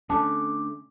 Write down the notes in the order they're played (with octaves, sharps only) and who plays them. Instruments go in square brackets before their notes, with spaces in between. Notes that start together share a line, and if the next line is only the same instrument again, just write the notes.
[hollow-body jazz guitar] D3 A3 [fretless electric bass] C#4 [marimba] A5 [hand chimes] D6